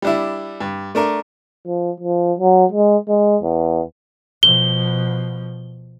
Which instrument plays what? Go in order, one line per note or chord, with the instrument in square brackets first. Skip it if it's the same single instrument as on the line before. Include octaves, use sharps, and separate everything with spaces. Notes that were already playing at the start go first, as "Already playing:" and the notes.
[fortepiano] G3 D4 E4
G2
A3 D4 A#4
[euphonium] F3
F3
F#3
G#3
G#3
E2
[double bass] B2 F3 [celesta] G7